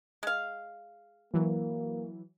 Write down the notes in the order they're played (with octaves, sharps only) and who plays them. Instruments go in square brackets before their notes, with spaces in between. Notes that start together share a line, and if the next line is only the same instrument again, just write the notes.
[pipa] G#3 F5
[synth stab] E3 F#3 [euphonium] A#3